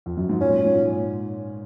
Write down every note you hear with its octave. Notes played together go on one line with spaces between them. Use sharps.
F2
F#2
G#2
A#2 C#4
G#2